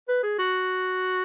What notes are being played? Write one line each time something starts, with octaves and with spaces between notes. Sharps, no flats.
B4
G#4
F#4